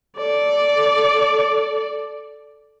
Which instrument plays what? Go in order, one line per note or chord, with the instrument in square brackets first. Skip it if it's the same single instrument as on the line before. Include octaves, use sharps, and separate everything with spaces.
[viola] A4 D5